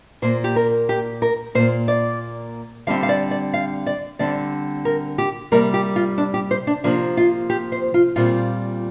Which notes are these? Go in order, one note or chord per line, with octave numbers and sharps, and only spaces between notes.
A#2 A#3 C5
G4
A#4
G4
A#4
A#2 A#3 C5
D5
D3 G3 C4 F5
F5
D5
D5
F5
D5
D3 G3 C4 D5
A#4
G4
C3 G3 A#3 A#4
G4
F4
D4
G4
C5
D4
C3 F3 A#3 D4
F4
G4
C5
F4
A#2 G3 C4 F4